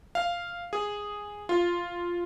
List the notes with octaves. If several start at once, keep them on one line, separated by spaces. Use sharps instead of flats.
F5
G#4
F4